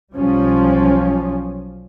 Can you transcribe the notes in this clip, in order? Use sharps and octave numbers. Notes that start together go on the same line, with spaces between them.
B1 F3 G3 C#4